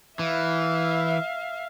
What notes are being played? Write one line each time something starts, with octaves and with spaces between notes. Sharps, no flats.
E3 E5 F5